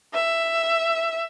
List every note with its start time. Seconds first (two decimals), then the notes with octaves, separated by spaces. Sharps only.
0.14 E5